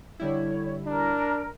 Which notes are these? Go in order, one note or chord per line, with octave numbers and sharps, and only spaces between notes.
D3 G3 E4 C#5
D4 A#4